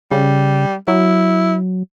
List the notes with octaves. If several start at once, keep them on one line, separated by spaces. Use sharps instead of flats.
C#3 G3
F#3 E4